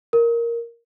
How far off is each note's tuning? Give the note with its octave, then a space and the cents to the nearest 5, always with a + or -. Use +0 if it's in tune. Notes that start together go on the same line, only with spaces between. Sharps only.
A#4 +0